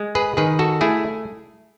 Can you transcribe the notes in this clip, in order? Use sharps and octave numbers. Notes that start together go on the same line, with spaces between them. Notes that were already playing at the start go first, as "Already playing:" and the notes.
Already playing: G#3
G#4 B4
D#3 G#4 B4
F#4 A4
A3 E4 G#4